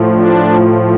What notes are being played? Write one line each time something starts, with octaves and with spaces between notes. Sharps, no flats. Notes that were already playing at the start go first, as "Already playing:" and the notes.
Already playing: A2 F3
D4